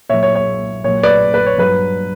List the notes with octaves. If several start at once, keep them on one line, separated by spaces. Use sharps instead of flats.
A#2 F#3 C#5 E5
C#5
C#5
A#2 F#3 C#5
B4 D5
B4
C#5
G2 F#3 B4